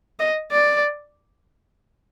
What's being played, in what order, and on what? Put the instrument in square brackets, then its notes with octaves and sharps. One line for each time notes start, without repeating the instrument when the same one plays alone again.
[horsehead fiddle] D#5
D5